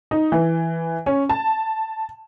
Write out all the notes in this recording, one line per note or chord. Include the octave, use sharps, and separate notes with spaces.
D#4
E3
C#4
A5